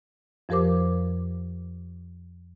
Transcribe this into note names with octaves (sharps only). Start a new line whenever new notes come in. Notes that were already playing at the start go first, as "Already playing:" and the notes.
F2 F3 G4 A#4 C5 D6